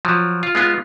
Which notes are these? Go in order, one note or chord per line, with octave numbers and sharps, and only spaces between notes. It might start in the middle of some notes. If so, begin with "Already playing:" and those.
F3 F#3
F4
G#3 B3 F4